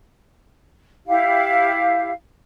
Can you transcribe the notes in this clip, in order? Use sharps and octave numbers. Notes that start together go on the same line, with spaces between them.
E4 G4 F5